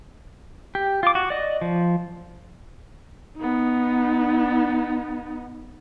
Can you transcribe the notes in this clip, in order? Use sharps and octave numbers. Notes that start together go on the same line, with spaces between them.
G4
F4 D6
F#4
D5 D#5
F3
B3 D#4